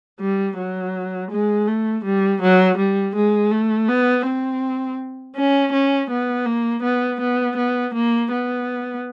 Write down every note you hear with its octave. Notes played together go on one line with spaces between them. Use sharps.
G3
F#3
G#3
A3
G3
F#3
G3
G#3
A3
B3
C4
C#4
C#4
B3
A#3
B3
B3
B3
A#3
B3